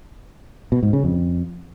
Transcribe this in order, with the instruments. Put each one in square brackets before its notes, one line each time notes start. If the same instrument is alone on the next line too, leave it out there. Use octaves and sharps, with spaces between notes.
[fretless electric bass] B2
G#2
C#3
F2